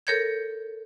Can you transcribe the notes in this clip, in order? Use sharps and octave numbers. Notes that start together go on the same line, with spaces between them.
A4 A#4 C#5 G6 G#6